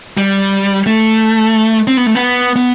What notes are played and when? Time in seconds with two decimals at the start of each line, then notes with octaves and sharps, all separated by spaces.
0.17 G3
0.86 A3
1.87 C4
1.97 B3
2.06 A3
2.15 B3
2.56 B3